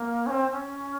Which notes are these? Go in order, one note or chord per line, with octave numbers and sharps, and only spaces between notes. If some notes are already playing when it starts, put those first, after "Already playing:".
Already playing: A#3
C#4
C4
C#4